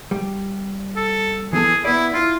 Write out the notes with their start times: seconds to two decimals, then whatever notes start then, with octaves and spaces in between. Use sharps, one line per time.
0.11 G3
0.96 A4
1.53 E3 B3 G#4 A4
1.85 B3 E4 D5
2.14 E4 F4